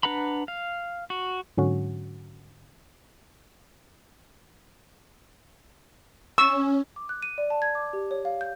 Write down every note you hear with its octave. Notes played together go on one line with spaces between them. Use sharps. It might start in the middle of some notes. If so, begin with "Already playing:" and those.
D4 B4 F#5 A#5 B5
F5
F#4
G#2 D3 F#3 C#4 F#4
C#4 C#6 E6
D6
F#6
D#7
D5
A5
G#6
D6
G4
C#5
F5
G6